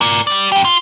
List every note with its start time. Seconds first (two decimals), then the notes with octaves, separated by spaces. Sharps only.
0.01 A#4 D5
0.27 G3 D5
0.52 F2 G4
0.65 F4